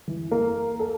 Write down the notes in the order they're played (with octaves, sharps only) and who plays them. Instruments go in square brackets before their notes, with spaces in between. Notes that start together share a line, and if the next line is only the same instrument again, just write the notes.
[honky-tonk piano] E3
A#3
A4